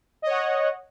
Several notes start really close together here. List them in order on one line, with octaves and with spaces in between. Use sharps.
D#5 C#5 F#5